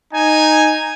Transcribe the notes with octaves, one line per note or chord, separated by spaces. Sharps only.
D#4 G#5